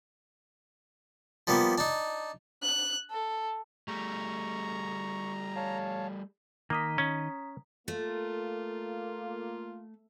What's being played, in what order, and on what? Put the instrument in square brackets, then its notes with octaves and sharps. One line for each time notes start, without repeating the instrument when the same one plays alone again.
[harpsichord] F3 G3 A#3 B3
D4 D#4
[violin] F#6
A4
[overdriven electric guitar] G3 A3 [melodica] A#5 [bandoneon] C#6
[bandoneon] C#5 F5 A5
[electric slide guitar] D#3 D#5 [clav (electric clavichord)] A#3 [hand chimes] A#5 D#6 B6
[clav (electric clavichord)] C#4
[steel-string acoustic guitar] A3 [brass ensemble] A#3 F4 [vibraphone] A4